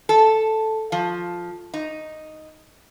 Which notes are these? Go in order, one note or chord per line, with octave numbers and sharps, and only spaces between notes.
A4
F3
D#4